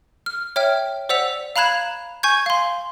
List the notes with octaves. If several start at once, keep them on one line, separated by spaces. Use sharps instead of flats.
F6
C#5 E5 G5 F6
C5 D5 F#5 E6 B6 F7
F5 A#5 B5 F#6 G#6 E7
G#5 C#6 G6 G#6
F5 C6